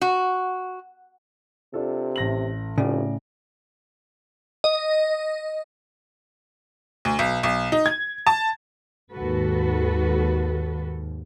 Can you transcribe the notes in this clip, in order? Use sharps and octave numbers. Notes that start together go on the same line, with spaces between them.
F#4
C3 D4 F4 A4
A1 A#6 F#7
F1 A2 C#3 D5
D#5
D2
B1
B1
D#4
G#6
A5
D#2 G#2 F#4 A4 B4